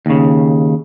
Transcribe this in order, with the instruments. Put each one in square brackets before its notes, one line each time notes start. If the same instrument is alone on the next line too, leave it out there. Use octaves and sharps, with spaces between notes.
[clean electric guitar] D#2 C#3